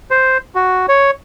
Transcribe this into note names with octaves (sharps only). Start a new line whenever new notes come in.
C5
F#4
C#5